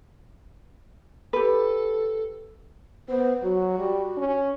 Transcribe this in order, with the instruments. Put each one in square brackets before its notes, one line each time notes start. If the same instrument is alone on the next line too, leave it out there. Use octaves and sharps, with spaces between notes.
[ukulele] G4 B4 [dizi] A4
[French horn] B3 [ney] C5
[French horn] F#3 [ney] F#4
[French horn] G3
C#4